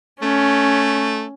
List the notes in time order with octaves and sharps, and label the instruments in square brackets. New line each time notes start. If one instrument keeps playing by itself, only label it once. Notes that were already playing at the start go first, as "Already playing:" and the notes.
[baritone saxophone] A3 [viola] C#4